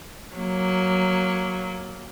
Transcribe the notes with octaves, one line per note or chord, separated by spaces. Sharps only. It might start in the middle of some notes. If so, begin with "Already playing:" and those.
F#3 A#3